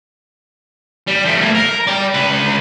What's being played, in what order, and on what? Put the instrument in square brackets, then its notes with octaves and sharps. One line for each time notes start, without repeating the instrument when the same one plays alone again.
[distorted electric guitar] G3
F3 A3
A3 A#3
A#4
D5 G5
C#2 B4